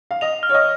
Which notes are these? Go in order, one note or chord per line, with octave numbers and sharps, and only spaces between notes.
F5
D#5 F7
F6
C#5
D#5